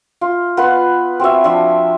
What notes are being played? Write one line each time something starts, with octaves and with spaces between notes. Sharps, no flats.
F4
B3 F4 B4
C4 F#4 E5
F3 D4 E5